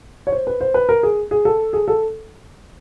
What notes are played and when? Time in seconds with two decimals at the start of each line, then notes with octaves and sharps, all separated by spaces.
0.27 C#5
0.32 C5
0.47 B4
0.61 C5
0.74 B4
0.89 A#4
1.03 G#4
1.31 G#4
1.45 A4
1.73 G#4
1.88 A4